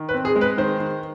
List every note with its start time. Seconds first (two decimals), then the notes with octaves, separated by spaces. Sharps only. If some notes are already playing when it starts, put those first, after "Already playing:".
Already playing: D#3
0.09 B4
0.14 C4
0.25 G#4
0.36 G#3
0.41 B4
0.58 D#3 C5
0.80 D#3